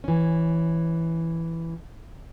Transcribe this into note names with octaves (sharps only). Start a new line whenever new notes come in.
E3 C#4